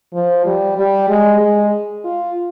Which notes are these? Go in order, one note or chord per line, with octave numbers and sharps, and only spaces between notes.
F3
G3
G3
G#3
G#3
F4